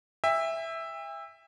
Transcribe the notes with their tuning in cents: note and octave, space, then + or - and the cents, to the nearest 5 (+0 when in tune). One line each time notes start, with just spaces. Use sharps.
E5 +0 G5 +45